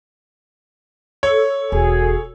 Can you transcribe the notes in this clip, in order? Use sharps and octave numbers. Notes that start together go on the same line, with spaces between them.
A4 C#5
E1 F#4 G#4